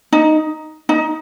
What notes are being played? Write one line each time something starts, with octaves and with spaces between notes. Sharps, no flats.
D#4
D#4